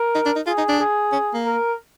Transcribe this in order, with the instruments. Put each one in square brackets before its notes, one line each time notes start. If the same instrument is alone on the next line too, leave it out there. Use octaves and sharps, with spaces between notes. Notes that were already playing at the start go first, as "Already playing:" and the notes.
Already playing: [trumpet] A#4
[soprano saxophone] D#4
D4
D#4
[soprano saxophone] F4 [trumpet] G#4
[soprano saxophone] D#4
D4
[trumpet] G#4
[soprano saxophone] C#4
A#3
[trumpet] A#4